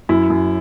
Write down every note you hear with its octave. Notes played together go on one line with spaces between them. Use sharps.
F#2 E4
F#2